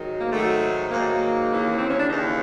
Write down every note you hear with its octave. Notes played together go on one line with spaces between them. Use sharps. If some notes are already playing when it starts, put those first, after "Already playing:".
Already playing: G#2 D#3 F#3
A#3
G#2 D#3 F#3 A3
G#2 D#3 F#3 A#3
A3
A#3
D#2 C#3 E3
C4
C#4
D4
D#2 C#3 E3 D#4